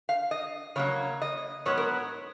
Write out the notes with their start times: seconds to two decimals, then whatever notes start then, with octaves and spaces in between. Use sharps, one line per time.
0.09 F5
0.31 D#5
0.76 C#3 F#3 A#3 C#5
1.22 D#5
1.66 G#2 F#3 B3 C#5
1.78 A#4